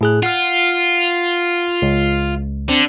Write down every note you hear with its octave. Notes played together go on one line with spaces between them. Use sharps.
A2 G#4 F#6
F4 F#5 F6
C#2
D3 C4